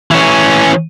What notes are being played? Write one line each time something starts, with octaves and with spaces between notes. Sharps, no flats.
E3 C#4